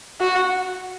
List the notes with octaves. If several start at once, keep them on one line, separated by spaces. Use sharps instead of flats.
F#4